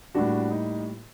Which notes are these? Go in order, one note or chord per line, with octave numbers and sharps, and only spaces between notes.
A2 G3 A#3 D4 F#4
D#4